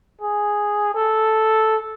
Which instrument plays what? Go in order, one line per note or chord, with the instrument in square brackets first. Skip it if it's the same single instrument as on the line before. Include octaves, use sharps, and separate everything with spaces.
[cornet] G#4
A4